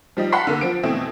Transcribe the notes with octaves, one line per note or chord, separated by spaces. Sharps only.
F3 G3 D#4
F5 F#5 A5 B5 C6 B6
D3 A#3
F3 D7
B2 E3 A3 C4